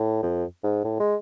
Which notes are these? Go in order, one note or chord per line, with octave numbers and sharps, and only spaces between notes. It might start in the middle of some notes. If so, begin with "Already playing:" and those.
Already playing: A2
F2
G#2
A2
G#3